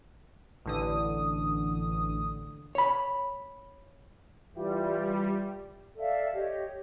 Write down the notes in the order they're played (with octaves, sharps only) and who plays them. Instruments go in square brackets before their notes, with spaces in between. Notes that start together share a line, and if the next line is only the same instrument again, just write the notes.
[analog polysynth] A1 D3 D#6
[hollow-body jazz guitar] C#5 B5
[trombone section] E3 E4 F4 [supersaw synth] G3
[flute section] A4 D5 E5 F5
G4 C#5 D#5